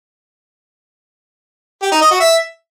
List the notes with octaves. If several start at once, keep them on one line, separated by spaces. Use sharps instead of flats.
G4
D#4
D#5
F#4
E5